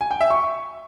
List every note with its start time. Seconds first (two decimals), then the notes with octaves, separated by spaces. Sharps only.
0.01 G#5
0.11 G5
0.21 E5
0.30 C#6